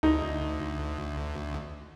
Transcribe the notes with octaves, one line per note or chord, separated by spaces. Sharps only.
D2 D#4